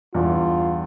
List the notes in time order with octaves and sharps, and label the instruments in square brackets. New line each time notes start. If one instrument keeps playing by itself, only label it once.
[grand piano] E2 G2 E3 [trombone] F4